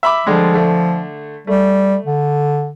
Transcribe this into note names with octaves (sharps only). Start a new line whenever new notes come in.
E5 B5 D6
D3 F3 G3 G#3
D3 A3
G3 A3
D3